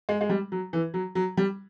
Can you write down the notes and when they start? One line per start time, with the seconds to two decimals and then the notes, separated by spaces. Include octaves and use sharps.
0.09 G#3
0.21 G#3
0.29 G3
0.52 F#3
0.73 E3
0.94 F#3
1.15 F#3
1.37 G3